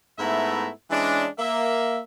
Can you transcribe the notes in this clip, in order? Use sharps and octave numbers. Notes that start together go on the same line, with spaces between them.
G#2 A3 B3 E4 E5 A#5
E3 G#3 C#4 D4
A#3 E5